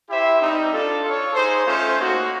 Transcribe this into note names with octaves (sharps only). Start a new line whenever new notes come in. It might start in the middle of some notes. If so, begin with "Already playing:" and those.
E4 G4 C5 E5
G3 C4 D#4
D4 F4 A4
F4 A4 C#5
D#4 G#4 C5
A3 C#4 F4 A4 C5
A#3 D#4 F#4